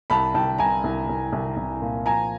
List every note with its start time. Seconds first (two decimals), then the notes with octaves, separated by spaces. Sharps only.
0.10 C2 A5 B5
0.34 C2 G5 A5
0.58 C2 G#5 A#5
0.84 C2
1.09 C2
1.33 C2
1.57 C2
1.82 A#2
2.06 F3 G#5 A#5